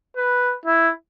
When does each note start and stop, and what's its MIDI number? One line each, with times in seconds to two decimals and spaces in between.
0.17 0.55 71
0.66 0.91 64